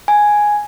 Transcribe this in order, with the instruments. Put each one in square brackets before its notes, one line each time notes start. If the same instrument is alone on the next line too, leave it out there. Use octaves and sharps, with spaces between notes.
[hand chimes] G#5